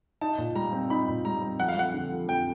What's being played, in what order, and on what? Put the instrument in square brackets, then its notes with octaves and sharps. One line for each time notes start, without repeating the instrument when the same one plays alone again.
[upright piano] D#4 [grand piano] A5
[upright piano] A#2
[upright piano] G3 [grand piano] A#5
[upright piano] C4
[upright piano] D#4 [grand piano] B5
[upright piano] A#2
[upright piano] G3 [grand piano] A#5
[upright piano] C4
[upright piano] F2 [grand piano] F#5
[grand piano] F5
[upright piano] F2 [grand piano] F#5
[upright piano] D3
F3
[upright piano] F2 [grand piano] G5